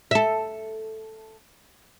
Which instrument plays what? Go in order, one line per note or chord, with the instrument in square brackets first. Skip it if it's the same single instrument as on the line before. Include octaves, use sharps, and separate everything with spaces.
[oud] A4 E5